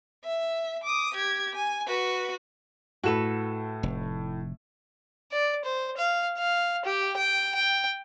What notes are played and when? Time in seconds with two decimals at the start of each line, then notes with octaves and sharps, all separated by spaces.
0.24 E5
0.84 D6 D#6
1.14 G4 G#6
1.55 G#5
1.87 F#4 B4
3.04 A2 F#4 A4 B4 E7
3.83 F1
5.32 D5
5.65 C5
5.97 F5
6.38 F5
6.85 G4
7.17 G5
7.55 G5